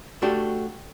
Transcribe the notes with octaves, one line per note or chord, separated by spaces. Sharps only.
A3 D4 F#4 G4